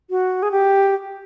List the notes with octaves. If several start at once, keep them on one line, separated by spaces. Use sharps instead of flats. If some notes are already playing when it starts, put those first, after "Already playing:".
F#4
G#4
G4